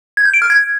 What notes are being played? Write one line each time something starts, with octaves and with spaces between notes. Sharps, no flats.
G#6
G6
D7
F6
G#6